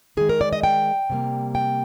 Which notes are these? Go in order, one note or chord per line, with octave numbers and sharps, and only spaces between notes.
D#3 G#3 G#4
A#4
D5
D#5
G5
C3 G3 A#3
G5